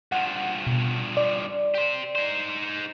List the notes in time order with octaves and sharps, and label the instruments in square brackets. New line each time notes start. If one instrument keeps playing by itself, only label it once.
[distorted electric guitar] G2 F3 [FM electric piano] F#5
[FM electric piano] B2
D5
[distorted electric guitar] G4 C5
D#4 C5